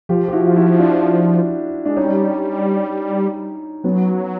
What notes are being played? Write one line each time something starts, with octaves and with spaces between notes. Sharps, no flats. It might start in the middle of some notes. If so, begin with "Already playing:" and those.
F3 F4 G4
G4
E4 F#4
F4
E4 F#4
D4 E4
G#3 D4
G3 C#4 D#4
F#3 B3 C#4